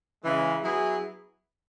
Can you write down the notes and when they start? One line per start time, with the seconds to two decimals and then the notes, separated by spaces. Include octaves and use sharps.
0.24 C#3 E3 G#3
0.64 F#3 B3 E4 G#4